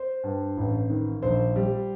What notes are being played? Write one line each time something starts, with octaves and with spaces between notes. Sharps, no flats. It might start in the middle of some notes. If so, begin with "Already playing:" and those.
Already playing: C5
G2
A1
D#3
A#1 C5
G3